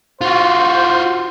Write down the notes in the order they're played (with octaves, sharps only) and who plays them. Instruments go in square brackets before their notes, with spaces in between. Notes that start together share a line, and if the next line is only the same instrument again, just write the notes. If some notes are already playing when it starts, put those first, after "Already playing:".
[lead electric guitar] F4 F#4 [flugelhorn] C5